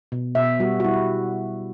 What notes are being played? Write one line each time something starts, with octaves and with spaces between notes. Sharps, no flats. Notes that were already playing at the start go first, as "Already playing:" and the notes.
B2
B2 E5
G3 F#4
F#4
G3 E4